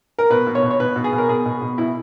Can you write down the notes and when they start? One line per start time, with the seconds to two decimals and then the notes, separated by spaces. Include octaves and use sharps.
0.19 A#4
0.30 B2 B4
0.47 B2
0.55 C#5
0.63 B2
0.71 C#5
0.80 B2 B4
0.96 B2
1.04 G#4
1.13 B2
1.18 A#4
1.29 B2 G#4
1.46 B2
1.62 B2
1.78 B2 E4